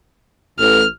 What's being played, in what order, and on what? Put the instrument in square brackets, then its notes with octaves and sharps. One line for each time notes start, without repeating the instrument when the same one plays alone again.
[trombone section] A1 [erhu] F6